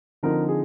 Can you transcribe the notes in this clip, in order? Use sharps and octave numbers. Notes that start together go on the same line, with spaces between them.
D3 F3 C4 D#4 A#4
G#4